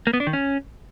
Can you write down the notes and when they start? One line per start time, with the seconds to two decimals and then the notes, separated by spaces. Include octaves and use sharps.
0.07 A#3
0.13 B3
0.20 D4
0.27 D#3
0.33 C#4